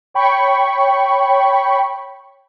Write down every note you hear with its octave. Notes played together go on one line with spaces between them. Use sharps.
C#5 G5 B5 C#6